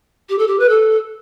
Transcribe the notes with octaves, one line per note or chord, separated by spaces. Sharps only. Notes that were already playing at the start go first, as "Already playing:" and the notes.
G4
A4
G4
B4
A4